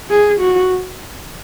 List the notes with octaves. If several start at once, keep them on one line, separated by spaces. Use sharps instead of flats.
G#4
F#4